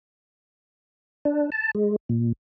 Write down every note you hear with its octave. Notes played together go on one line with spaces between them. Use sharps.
D4
A5
G#3
A#2